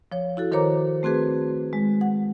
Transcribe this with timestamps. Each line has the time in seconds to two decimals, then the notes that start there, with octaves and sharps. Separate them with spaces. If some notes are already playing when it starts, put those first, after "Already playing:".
0.12 F3 C#5
0.37 E4 F#4 A4
0.52 D#3 A#4 C5 C#5 A#5 D6
1.03 A3 C4 F#4 G#4 B4
1.73 G#3
2.01 F#5